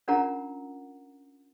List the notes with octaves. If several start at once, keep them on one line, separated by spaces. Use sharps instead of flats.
C#4 D4 F4 A#4 F#5 A#5